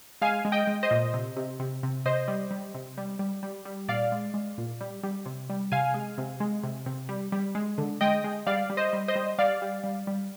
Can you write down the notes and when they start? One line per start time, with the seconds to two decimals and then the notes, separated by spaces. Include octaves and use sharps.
0.21 G#3 F5 G#5
0.45 G#3
0.52 D#5 G5
0.67 G#3
0.83 C5 D#5
0.91 A#2
1.14 C3
1.36 C3
1.60 C3
1.83 C3
2.05 C3 C5 D#5
2.28 G3
2.51 G3
2.74 C3
2.97 G3
3.19 G3
3.43 G3
3.65 G3
3.88 A#2 D5 F5
4.12 G#3
4.34 G#3
4.58 A#2
4.81 G3
5.03 G3
5.26 C3
5.50 G3
5.72 C3 F5 G#5
5.94 G#3
6.18 C3
6.40 G#3
6.63 C3
6.86 C3
7.09 G3
7.32 G3
7.55 G#3
7.78 D3
8.01 G#3 D#5 G5
8.24 G#3
8.47 G3 D5 F5
8.70 G3
8.77 C5 D#5
8.93 G3
9.08 C5 D#5
9.15 G3
9.38 G3 D5 F5
9.62 G3
9.84 G3
10.07 G3